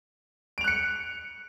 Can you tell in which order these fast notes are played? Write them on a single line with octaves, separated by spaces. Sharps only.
D7 F7 F#6 C#7